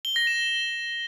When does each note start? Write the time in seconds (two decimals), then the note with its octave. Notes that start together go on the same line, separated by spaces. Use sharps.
0.05 G7
0.16 A#6
0.27 E7